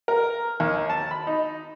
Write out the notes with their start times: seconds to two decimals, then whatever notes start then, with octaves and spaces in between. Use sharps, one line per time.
0.08 A#4
0.60 D#2
0.89 A5
1.11 B5
1.27 D#4